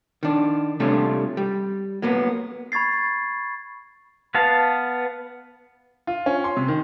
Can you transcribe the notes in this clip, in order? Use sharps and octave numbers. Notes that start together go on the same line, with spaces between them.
D#3 D4
C3 G3 A3 C#4 D4 F4
G3
F#3 A#3 B3
B5 C#6 G#6 A6 C7
B3 B4 F5 A5
F4
C#4
C6
C3
D#3